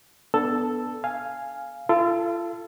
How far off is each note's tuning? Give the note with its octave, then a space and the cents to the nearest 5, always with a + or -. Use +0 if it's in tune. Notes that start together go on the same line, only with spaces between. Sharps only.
B3 +0 D4 +0 A4 +0
F5 -5 G#5 +0
F4 -35 A4 +0